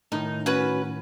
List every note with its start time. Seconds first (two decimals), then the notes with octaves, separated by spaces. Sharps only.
0.12 A2 D#3 D#4
0.46 C#4 F#4 B4